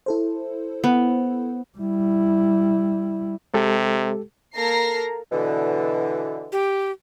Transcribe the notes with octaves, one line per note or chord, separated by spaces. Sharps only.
E4 A4 C5
B3
G3 E4
C3 G#3 G4 A4
A#3 A4 A#4 A#5 A#6 C7
B2 D3 E3
G4